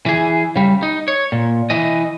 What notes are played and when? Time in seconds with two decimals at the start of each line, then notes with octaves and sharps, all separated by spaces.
0.06 E3 G#4
0.56 C#3 G3
0.83 D#4
1.08 C#5
1.32 A#2
1.70 E3 D#5